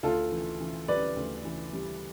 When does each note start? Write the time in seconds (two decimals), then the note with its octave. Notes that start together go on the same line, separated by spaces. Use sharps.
0.03 D2 F4 A4
0.32 E3
0.60 E3
0.88 G3 B4 D5
1.16 D2
1.45 E3
1.73 G3